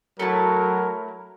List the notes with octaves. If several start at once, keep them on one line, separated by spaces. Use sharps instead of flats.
F#3 A3 E4 A#4 A5